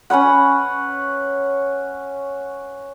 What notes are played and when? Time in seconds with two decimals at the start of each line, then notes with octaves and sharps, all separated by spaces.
0.10 C#4 B4 C#5 F#5